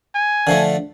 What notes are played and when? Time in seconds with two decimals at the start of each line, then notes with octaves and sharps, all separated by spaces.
0.15 G#5
0.47 D3 F3 A3